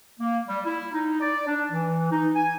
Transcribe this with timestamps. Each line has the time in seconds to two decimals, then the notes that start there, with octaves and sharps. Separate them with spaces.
0.19 A#3
0.48 G3
0.64 E4
0.93 D#4
1.20 D5
1.47 D4
1.72 E3
2.11 D#4
2.35 G#5